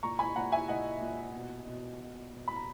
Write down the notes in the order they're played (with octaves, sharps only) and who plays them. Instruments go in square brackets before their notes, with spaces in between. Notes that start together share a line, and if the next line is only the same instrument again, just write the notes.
[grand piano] A#2 A#5 C#6
G#5 B5
A#2 F#5 A#5
E5 G#5
A#2 D#5 F#5
A#2
B2
B2
B2
B2
B5
A#5